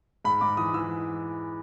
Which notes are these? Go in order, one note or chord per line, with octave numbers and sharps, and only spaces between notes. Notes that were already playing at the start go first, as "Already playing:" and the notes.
G#2 B5
G#2 D6
E3 D#6
E3 E6